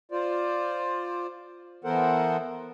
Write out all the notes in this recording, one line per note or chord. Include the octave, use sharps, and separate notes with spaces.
F4 C5 D5
E3 B3 A4 A#4 C5 F#5